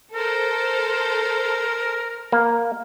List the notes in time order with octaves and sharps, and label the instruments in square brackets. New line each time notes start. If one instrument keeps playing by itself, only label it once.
[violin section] A4 C5 [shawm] A#4
[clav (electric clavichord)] A#3